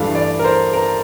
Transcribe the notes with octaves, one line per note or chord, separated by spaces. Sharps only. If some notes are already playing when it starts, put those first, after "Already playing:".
Already playing: G2 E3 A3 D4 F5
D5
A#4
C5
A#4